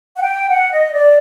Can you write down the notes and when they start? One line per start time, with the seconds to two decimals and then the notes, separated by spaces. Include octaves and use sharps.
0.17 F#5
0.21 G5
0.49 F#5
0.71 D#5
0.93 D5